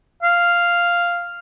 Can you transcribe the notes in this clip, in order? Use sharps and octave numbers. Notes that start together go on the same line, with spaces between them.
F5